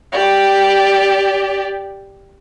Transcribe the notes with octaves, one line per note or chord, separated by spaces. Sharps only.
G4 D5